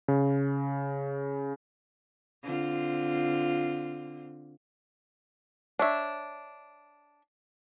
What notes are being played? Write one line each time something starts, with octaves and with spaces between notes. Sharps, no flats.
C#3
D3 C4 F4
D4 C#5 E5